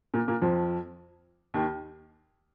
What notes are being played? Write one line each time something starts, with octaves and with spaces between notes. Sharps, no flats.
A#2 A#3
A#2 A#3
F2 F3
D#2 D#3